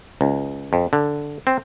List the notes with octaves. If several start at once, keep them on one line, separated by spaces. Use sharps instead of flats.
C#2
F2
D3
C4